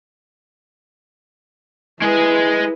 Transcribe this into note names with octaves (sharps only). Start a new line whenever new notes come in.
G#3 E4 G#4 B4